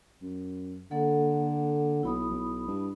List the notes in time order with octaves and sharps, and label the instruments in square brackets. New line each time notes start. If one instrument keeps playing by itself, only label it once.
[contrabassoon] F#2
[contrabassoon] D3 [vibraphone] A#3 A4 F#5
[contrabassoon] B1 [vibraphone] E4 B5 D#6
[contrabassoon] B1
G2